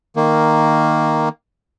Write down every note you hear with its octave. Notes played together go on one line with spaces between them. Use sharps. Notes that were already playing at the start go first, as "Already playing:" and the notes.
D#3 A#3